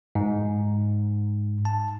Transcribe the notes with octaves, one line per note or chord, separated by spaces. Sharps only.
G#2
A5